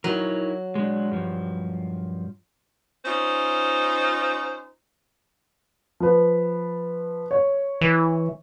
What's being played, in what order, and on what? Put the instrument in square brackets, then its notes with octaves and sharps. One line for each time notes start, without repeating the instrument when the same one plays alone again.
[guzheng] F#3 [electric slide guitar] D#4 E4 A#4
[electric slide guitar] G#3 D4
G2 F3
[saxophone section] C#4 D#4 F4 C5
[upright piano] F3 B4
C#5
[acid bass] E3